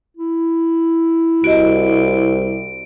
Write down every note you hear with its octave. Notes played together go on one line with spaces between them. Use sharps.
E4
C2 F#4 D#5 D7